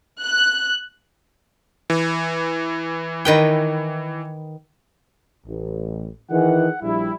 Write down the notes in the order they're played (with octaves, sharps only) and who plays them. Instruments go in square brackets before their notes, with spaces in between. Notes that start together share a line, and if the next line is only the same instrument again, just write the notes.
[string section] F#6
[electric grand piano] E3
[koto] D#3 B4 G5
[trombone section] A1
[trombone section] D#3 E3 [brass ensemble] G#4 F#5
[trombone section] A#1 [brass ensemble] G3 E4